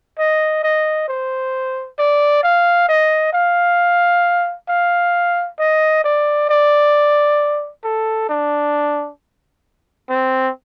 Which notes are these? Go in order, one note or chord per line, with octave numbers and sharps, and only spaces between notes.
D#5
D#5
C5
D5
F5
D#5
F5
F5
D#5
D5
D5
A4
D4
C4